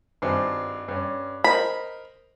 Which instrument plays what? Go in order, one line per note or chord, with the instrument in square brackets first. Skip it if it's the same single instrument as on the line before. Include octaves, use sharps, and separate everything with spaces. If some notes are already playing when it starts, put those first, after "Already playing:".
[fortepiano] G#1 G2 C5
G2 C#4
[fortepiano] A#4 C5 D#5 [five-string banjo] B5